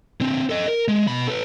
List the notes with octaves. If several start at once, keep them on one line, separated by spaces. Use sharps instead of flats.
D3 C4
A4 D#5
A#4
G#3
B2 B5
A4 B4